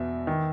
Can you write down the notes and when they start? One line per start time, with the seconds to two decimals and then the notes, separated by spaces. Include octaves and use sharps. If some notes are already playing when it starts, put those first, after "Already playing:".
Already playing: E2 B2 E5
0.27 D#3